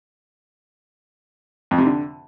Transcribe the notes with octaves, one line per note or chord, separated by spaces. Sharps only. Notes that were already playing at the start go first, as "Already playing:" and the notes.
F2
C3
D3